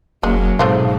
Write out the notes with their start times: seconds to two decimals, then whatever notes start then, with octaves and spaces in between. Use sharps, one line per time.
0.23 F1 F#3 G#3 A#3 C#4
0.59 G#2 B2 A3 C4 F4